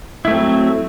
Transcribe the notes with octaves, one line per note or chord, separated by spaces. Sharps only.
F#3 A3 C4 E4